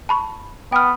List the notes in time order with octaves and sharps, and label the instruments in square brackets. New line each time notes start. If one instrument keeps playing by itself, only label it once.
[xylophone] A5 B5 C#6
[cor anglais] B3 [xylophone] G5 F6